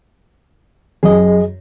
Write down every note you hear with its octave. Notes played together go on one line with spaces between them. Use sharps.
F#2 G#4 D#5